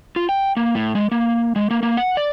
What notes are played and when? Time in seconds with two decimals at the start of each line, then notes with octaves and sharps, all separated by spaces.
0.16 F4
0.29 G5
0.57 A#3
0.75 A2
0.95 G#3
1.11 A#3
1.56 G#3
1.70 A#3
1.83 A#3
1.97 F#5
2.17 D5